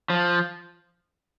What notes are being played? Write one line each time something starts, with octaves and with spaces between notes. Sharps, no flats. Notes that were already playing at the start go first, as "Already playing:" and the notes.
F3